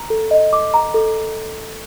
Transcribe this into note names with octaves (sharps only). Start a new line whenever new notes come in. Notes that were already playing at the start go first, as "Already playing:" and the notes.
Already playing: A#5
A4
D#5
D6
A#5
A4